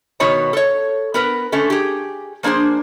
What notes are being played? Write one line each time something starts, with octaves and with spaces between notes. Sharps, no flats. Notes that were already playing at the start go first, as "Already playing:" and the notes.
B2 D#3 B3 C#5 A#5
A4 C#5
B3 A#4 B4
D3 A3 C#4
G4 G#4
F3 A#3 D4 G#4 C5